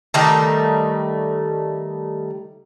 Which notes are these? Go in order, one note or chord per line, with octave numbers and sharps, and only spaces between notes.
D#3 G3 A3 D#4